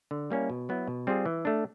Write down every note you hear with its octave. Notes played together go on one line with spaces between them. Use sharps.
D3
G3 A#3 C#4 E4
B2
F#3 B3 E4
B2
G3 C4 F4 G#4
E3
A3 D4